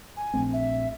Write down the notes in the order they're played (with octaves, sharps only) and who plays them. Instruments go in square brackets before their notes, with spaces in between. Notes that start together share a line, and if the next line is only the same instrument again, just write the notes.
[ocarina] G#5
[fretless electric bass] A#1 A3 C4
[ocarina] E5